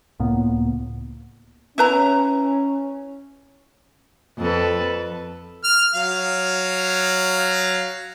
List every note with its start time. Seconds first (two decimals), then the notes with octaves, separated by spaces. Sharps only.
0.20 C#2 A2 A#3 B3
1.78 C#4 E4 B4 A#5
4.38 F2 A4 B4
5.64 F6
5.94 F#3 F5